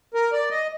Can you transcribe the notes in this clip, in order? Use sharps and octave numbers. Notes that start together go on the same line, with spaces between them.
A#4
D5
D#5